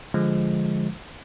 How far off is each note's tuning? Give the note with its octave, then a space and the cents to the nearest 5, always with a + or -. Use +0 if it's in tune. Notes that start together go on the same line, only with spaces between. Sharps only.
D3 +0 F3 +0 G#3 +0